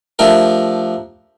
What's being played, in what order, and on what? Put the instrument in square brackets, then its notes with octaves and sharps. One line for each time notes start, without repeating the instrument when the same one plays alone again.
[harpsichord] F3 A3 D4 G4 A#4